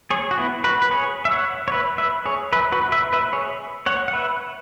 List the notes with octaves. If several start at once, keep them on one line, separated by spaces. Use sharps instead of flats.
G#4 C#5
F#4
B3 E4
F#4 B4
B4
G#4 C#5
E5
C#5 F#5
C#5
B4 E5
B4 E5
G#4 C#5
B4 E5
F#4 B4
B4 E5
B4 E5
G#4 C#5
C#5 F#5
F#5
B4 E5